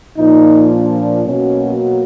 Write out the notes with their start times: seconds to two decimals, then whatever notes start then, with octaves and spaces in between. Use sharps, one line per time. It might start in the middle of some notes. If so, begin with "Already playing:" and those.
0.16 A#2 F3 A#3 D#4
0.71 D4
1.25 B2 F#3 A#3 C#4